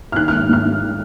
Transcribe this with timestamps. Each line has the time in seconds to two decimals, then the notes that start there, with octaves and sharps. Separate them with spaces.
0.12 F6
0.16 D#3 F#6
0.28 G#2 F6
0.49 G#2 F6
0.66 G#2
0.82 D#3